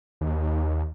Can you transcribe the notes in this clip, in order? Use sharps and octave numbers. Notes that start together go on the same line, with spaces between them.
D#2